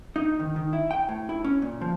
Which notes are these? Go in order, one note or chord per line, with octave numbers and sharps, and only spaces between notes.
D#4
D#3
D#3
E4
G5
A2
E4
C#4
A#2
F3